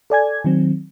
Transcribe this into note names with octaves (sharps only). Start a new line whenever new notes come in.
A4 D5 G#5 G#6
D#3 F#3 C4